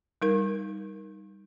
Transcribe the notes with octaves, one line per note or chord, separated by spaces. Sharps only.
G3 D#4 A#4 G6